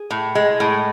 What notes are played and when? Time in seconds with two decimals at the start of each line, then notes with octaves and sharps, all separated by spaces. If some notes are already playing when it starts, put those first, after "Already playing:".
Already playing: G#4
0.11 A2
0.35 G#3
0.60 A2